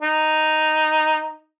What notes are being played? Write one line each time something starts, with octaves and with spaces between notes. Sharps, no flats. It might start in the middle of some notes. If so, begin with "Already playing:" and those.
D#4